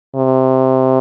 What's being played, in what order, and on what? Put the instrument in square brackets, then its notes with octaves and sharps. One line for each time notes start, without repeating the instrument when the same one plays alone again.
[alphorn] C3